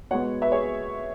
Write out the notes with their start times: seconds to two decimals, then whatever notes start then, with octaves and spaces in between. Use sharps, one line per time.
0.11 B2 G#3 B3 C#5 F#5
0.41 B4 E5
0.52 G#4 C#5